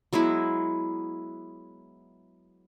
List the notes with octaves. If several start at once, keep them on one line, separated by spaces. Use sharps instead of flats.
F#3 G#3 B3 E4